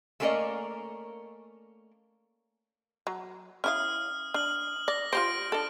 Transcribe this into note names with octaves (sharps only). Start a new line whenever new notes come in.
A3 A#3 C#4 A#4 D5 D#5
F#3
C#4 E4 F5 D#6 F6
D4 F6 F#7
D5 A#6
F4 G4 C5 A#6 D7
D4 A4